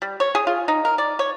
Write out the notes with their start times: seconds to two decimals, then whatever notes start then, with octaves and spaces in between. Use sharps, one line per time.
0.02 G3
0.20 C#5
0.35 G#4
0.47 F4
0.68 D#4
0.85 A#4
0.98 D5
1.19 C#5